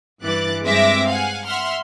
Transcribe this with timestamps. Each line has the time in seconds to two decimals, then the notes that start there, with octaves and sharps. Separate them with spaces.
0.22 G2 E3 D6 F#6 A6
0.63 G2 G#3 C4 E5 D6 A#6
1.09 F5 F#5 G#5
1.47 E5 F#5 C6 F6